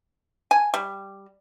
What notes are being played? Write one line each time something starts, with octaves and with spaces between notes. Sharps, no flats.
G#5
G3